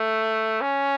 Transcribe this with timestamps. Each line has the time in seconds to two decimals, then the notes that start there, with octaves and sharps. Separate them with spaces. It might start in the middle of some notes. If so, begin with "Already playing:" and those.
Already playing: A3
0.61 C#4